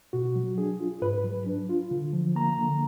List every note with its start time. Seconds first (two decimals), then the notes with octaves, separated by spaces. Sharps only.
0.13 B2 F#4
0.36 F#3
0.58 D4 G#4
0.80 F4
1.02 G#2 B4
1.24 F#3
1.46 D4
1.69 F4
1.91 D3
2.13 F3
2.36 A#3 A#5
2.58 D3